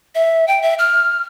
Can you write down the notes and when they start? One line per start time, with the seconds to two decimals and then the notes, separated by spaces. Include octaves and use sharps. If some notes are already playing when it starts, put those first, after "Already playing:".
0.15 E5
0.48 G5
0.62 E5
0.79 F6